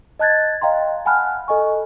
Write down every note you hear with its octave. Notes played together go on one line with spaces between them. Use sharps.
D#5 A5 F#6 G#6 A6
D#5 F5 G5 A#5 C6
F#5 G#5 A5 B5 F6 F#6
A4 D#5 G#5 C#6